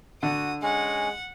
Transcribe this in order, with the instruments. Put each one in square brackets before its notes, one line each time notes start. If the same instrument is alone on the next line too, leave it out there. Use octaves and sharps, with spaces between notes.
[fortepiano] D3 [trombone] F#4 [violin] D#6
[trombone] G#3 [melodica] C#4 [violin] F#5